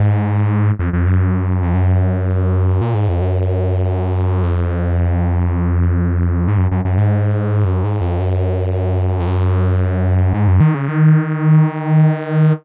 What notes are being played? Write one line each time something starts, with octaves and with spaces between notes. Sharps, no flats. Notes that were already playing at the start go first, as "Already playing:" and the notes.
Already playing: G#2
F2
F2
F#2
F2
F#2
A#2
G#2
F2
F#2
F2
G#2
F#2
F#2
F#2
G#2
F#2
G#2
F2
F#2
F2
F#2
G#2
F#2
D#3
C#3
D#3